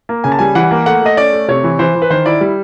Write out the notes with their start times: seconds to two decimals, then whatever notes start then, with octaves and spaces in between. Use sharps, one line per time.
0.09 A#3
0.24 C#3 G#5
0.32 A5
0.39 G3 G#5
0.55 E3 F#5
0.71 A#3
0.86 A3 F#5
1.01 A3 D#5
1.17 C#4 D5
1.33 A3
1.48 C3 C#5
1.64 E3
1.79 E3 C5
1.95 E3
2.02 B4
2.10 D#3 C5
2.26 E4 D5
2.41 G3